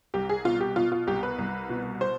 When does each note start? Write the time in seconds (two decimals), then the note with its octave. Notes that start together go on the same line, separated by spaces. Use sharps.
0.14 C2 G4
0.29 G#4
0.45 B2 F4
0.61 G4
0.76 B2 F4
0.92 F4
1.07 C2 G4
1.23 B4
1.39 C2
1.70 B2
2.01 C5